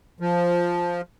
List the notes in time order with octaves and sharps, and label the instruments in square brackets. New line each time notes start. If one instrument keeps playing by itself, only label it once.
[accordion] F3